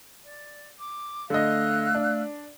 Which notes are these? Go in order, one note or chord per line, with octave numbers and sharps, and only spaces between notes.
D5
D6
D3 A3 D#5 F5 E6 F#6
D4